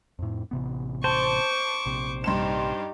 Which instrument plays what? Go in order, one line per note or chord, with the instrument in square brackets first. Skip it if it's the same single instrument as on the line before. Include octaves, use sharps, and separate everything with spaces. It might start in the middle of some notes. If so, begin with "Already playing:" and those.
[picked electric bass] F2 A2
A1 C3 B3
[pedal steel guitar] C5 [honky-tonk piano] A5 [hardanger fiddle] C#6 D6
[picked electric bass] A#1 C3
[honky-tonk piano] G2 C6 E7 [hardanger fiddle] D#4 G4